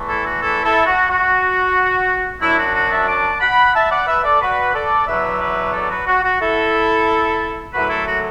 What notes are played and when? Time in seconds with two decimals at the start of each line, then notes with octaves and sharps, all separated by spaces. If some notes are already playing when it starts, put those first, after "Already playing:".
Already playing: E2 E3 A3
0.08 E4 A4
0.25 F#4
0.42 E4 A4
0.64 E4 A4
0.86 F#4
1.09 F#4
2.41 F#2 F#3 D4 E4
2.58 F#4
2.75 F#4
2.91 E5 A5
3.08 A5 D6
3.41 F#5 B5
3.74 E5 A5
3.91 D5 F#5
4.07 B4 E5
4.24 A4 D5
4.41 F#4 B4
4.74 A4 D5
5.07 E2 B2 F#3 D4 B4 E5
5.41 B4 E5
5.73 A4 D5
5.90 F#4 B4
6.07 F#4
6.24 F#4
6.40 E4 A4
7.73 F#2 D3 F#3 A3 E4 F#4 B4
7.89 E4 A4
8.06 F#4